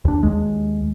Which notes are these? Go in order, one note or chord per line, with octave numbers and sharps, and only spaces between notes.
D#2 D4
D#2 G#3